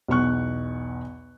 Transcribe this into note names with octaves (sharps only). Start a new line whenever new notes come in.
B1 E2 C#6 F#6